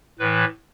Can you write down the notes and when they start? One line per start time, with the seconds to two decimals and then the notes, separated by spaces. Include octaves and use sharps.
0.19 A2 E3 B4